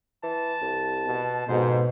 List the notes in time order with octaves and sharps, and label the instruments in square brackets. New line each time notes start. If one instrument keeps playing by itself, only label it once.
[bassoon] E3 [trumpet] A5
[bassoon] C2
[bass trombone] B2
[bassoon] F2 [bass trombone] G#2 [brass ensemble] B2 [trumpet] C5